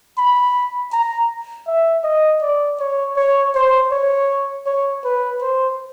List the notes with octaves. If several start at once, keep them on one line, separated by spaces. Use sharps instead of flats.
B5
A#5
E5
D#5
D5
C#5
C#5
C5
C#5
C#5
B4
C5